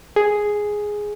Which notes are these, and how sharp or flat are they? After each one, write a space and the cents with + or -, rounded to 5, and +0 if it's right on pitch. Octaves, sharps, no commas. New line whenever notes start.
G#4 +0